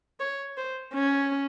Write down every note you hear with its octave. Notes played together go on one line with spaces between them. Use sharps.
C#5
C5
C#4